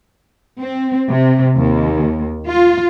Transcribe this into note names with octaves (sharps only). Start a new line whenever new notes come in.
C4
C3
D#2
F4